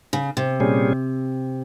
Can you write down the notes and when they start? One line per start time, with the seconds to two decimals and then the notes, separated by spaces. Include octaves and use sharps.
0.13 C#3
0.37 C3
0.60 A#2 G3 C#4 G#4